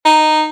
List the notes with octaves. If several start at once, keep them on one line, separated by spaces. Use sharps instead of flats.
D#4